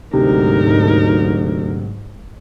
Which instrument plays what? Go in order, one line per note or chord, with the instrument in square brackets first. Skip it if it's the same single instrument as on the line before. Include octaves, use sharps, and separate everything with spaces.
[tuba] D2 [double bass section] G#2 F#3 [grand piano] C3 [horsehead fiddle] D#4 A#4